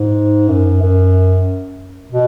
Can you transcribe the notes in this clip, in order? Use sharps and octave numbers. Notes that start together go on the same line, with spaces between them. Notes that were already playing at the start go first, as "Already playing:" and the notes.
Already playing: G#2
F#2
F#2
B2